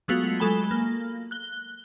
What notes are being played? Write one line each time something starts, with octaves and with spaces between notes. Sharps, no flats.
F#3 G#3 A3 B3 F4 F#4
F#3 G#3 A4 G#5 B5 G7
A#3
F#6 G7